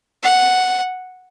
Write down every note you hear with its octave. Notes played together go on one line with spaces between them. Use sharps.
F#5